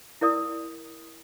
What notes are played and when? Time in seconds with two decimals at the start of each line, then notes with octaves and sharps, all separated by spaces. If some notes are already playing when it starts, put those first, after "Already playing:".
0.21 E4 A#4 D5 D#6